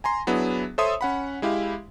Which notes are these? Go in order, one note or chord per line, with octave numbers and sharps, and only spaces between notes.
G#5 A#5 C6
F#3 B3 D4 E4 G#4
A4 C5 C#5 E5 C6 D#6
C#4 F#5 B5
G#3 E4 G4 F5